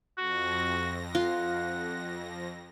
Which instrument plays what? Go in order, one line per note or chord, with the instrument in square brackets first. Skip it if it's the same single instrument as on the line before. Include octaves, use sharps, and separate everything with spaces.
[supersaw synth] F2 A#6 [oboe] F#4
[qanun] F4 [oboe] F#5